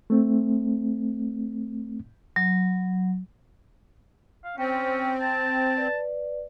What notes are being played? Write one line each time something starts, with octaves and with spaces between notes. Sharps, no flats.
A3 C4
F#3
F5
C4 C#4 G5
A5
B4 D5